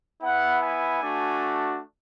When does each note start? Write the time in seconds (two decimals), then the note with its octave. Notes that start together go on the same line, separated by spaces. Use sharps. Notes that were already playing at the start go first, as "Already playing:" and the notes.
0.22 B3 E4 F#5
0.61 G#5
1.01 A3 D4 F#4